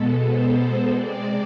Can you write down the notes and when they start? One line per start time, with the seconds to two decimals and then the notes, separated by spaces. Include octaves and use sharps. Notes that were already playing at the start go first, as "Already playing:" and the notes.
Already playing: B2 G#3 B3 A4
0.25 C5
0.91 C3 G#3 C4 D5